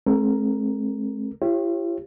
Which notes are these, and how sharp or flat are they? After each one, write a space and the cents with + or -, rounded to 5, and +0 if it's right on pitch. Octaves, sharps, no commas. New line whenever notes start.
G#3 +45 C4 +35 A#4 +0
E4 +45 G4 +0 C#5 -40